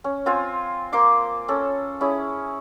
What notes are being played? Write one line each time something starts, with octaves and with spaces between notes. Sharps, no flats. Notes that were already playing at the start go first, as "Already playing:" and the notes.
C#4
C4 F4 C5 G#5
A#3 C5 C6 D6
C#4 A4
C#4 E4 G#4